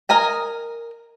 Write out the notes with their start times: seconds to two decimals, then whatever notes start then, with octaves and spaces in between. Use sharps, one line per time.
0.09 A#4 D#5 G#5 A#5